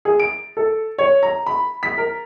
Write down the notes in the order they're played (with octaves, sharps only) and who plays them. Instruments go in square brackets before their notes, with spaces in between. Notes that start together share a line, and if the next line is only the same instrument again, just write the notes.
[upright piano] G#4
D7
A4
C#5
A#5
B5
B6
A#4